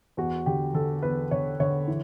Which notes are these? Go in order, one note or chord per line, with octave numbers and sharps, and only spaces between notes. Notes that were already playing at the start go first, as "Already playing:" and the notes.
E2 F#4
D3 G4
D3 A4
E2 B4
D3 C#5
D3 C#5
E3